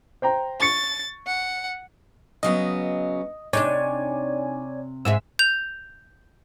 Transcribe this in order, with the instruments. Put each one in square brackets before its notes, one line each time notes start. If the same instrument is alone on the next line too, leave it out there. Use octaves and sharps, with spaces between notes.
[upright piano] C5 G5 A#5
[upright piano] C#6 C#7 [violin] A6
[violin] F#5
[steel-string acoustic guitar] C#3 F#3 B3 [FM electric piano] D#5
[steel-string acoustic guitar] C3 [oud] D4 D#4 [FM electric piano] C#5 D5 G#5
[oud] G#2 G#3 E5 [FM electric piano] E6
[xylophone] G6 F7